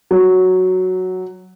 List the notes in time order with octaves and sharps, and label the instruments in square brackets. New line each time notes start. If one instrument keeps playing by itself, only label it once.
[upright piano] F#3